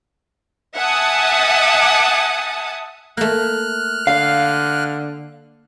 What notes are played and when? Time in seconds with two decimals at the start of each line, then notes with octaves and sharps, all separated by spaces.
0.76 E5 F#5 G#5 A5 D#6
3.17 A3 A#3 F6 F#6
4.07 D3 F5